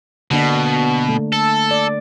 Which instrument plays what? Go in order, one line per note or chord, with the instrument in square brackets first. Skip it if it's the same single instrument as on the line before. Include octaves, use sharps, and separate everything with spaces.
[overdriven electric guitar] B2 [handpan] D3 A#3 D4
[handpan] A3
[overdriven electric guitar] A4
[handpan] D5